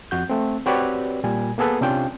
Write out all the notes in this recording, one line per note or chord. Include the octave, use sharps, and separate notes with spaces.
F2 F#4 G6
A3 C4
C4 F#4 G4 B4 C#5 D5
A#2 G3 G#5
A#3 B3 G#4 A4 B4
C3 C#4 D4 F4 G5